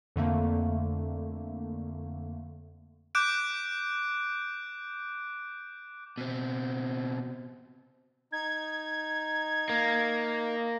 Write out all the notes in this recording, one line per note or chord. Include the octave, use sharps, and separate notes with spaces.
F2 D3 A3 A#3
D6 F#6 G6 D7
B2 C4
D#4 G#6
A#3